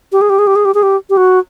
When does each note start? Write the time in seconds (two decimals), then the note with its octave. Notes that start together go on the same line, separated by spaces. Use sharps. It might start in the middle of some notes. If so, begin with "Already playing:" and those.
0.12 G4
0.21 G#4
0.30 G4
0.39 G#4
0.47 G4
0.56 G#4
0.65 G4
0.74 G#4
0.83 G4
1.10 G4
1.17 F#4